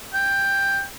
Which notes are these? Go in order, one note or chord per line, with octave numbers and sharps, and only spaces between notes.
G5